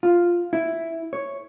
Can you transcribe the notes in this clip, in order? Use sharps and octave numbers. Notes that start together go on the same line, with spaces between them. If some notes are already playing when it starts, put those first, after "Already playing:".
F4
E4
C#5